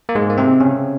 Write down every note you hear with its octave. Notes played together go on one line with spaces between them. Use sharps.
A#3
G#2 G#3
A#3
C3 C4
C#3 C#4